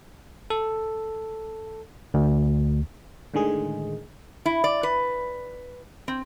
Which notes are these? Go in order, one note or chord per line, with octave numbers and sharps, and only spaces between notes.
A4
D2
A2 D3 D#3 G#3 G#4
E4
D5
B4
C4